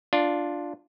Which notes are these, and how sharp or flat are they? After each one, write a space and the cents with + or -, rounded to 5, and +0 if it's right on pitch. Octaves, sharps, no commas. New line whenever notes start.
D4 +0 F4 +0